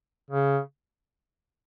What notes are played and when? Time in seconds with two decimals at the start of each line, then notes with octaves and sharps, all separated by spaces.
0.31 C#3